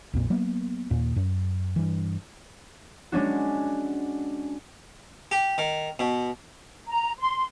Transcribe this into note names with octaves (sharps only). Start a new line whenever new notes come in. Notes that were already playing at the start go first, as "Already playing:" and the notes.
A#1 F2 A#2
F#3 A#3 B3
D#2 A#2
F#2
G2 E3
G#3 C#4 D4 F#4
G4
D#3
B2
A#5
C6